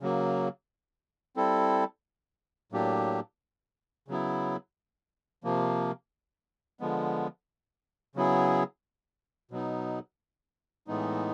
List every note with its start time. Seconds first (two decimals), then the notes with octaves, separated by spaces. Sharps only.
0.01 C#3 F#3 A#3
1.36 G3 C4 E4 A4
2.72 A2 F#3 A#3 D4 G4
4.08 C#3 F#3 B3 E4
5.44 C3 F3 A#3
6.80 D3 F3 G#3 B3
8.15 C#3 F#3 B3 E4 G#4
9.51 B2 F#3 B3 D#4
10.87 A2 E3 G#3 B3 D#4